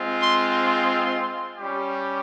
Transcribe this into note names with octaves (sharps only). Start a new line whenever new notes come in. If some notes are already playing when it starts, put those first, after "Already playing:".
Already playing: G#3 C4 F4
C6
C6
G3 C#4 G4